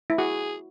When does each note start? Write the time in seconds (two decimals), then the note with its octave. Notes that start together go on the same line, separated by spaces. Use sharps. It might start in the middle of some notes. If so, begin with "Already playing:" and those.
0.10 E4
0.18 F#4 G#4